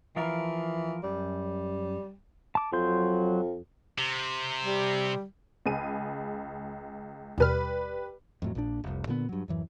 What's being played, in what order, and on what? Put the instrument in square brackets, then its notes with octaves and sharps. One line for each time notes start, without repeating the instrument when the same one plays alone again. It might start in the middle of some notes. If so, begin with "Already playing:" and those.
[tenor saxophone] E3 [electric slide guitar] F3 F4 A#4
[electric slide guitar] F#2 [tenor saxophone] G3
[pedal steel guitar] A5 D6
[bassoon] F2 [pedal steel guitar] F#3 C6 G6
[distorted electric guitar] C3
[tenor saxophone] G3
[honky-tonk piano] C#2 G#4 D#7
[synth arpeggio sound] D#2 B2 F6 [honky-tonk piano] G3 B4
[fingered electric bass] F2 A2 F#3
A#1 A#2 D4
F1 C2
A#2 D3 D#3 B3
G2 F#3
D1 F#2 E3